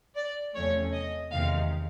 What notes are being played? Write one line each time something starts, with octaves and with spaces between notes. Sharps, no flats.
D5
E2 C3 F3 A3 C#4 C#5
D#5
E2 C3 D#3 G#3 F5